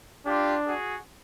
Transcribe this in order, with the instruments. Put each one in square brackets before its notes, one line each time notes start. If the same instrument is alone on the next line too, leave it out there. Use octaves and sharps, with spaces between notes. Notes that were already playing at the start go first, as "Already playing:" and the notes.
[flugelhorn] D4 [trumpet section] F4 G4
[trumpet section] F#4 G#4